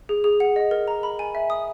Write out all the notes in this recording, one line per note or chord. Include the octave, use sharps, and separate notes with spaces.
G#4
G#4
F#5
D#5
A#4
A#5
B5
G#5
E5
D#6